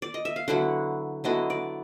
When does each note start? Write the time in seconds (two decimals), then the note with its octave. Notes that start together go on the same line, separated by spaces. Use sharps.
0.02 D5
0.14 D#5
0.25 E5
0.36 F5
0.48 D3 F#3 B3 E4 F#5
1.24 D3 F#3 B3 E4 D#5
1.50 D5